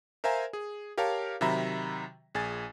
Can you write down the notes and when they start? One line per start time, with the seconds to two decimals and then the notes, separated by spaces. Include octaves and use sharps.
0.24 A#4 C5 E5 F5 G#5 A#5
0.53 G#4
0.98 G4 A#4 C#5 F5 A5
1.41 C3 D#3 F#3 E5 A#5 B5
2.35 A#1 G#4 G#5 A6